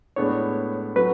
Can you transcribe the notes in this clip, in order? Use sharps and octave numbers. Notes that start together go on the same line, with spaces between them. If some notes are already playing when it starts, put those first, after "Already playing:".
A2 G#3 B3 D4 C#5
F#3 C#4 F#4 A4 B4